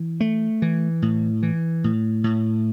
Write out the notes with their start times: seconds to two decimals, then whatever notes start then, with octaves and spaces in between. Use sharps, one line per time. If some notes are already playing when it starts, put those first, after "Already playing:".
Already playing: E3
0.20 A3
0.62 E3
1.02 A2
1.43 E3
1.84 A2
2.24 A2